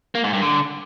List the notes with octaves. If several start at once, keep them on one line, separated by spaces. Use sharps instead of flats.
A#3
G#2
G2
D3